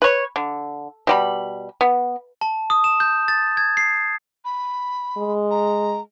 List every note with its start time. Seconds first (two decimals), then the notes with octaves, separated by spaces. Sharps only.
0.02 B4 C#5
0.36 D3
1.07 B2 G3 B5
1.81 B3
2.41 A5
2.70 D#6
2.84 E7
3.00 G6
3.28 A6
3.57 G#6
3.77 C7
4.45 B5
5.17 G#3
5.51 A#5